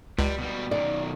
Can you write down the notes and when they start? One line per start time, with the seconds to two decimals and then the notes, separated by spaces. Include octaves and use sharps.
0.19 C#2 G3
0.39 B2 G3
0.71 B1 D#3 D5